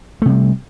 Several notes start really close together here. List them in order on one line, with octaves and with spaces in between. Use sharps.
A3 C3 G3